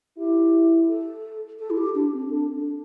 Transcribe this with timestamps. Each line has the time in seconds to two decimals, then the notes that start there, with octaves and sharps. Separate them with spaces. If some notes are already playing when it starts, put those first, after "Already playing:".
0.17 E4 G4
0.88 A4
1.59 A4
1.70 E4
1.77 G4
1.95 D4
2.13 C4
2.30 D4 A4
2.54 D4